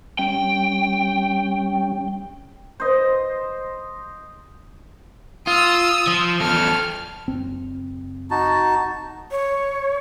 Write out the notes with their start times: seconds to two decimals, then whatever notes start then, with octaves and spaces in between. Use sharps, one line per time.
0.19 G3 C#4 G5
2.80 C5 D#5
5.47 F4 D#6 E6
6.07 F3
6.40 E2 A4 F6
7.27 F#1 C4
8.31 D#4 F#4 A5
9.31 C#5